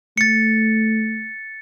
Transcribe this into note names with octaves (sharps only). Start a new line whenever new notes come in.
A3 A6 C#7